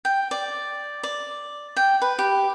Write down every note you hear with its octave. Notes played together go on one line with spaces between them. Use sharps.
G5
D5
D5
G5
B4
G4